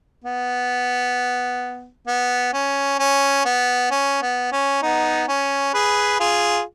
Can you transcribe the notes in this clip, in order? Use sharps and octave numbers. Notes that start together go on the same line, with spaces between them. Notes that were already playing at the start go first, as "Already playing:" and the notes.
B3
B3
C#4
C#4
B3
C#4
B3
C#4
B3 D#4
C#4
G#4 B4
F4 G#4